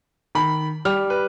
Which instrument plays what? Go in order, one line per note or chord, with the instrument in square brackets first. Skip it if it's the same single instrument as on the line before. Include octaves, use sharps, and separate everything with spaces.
[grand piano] D#3 B5
[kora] G3 [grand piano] F6
[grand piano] B4